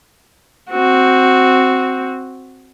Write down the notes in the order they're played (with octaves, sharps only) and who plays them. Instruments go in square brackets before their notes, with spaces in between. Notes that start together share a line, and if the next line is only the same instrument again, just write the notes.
[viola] C4 F#4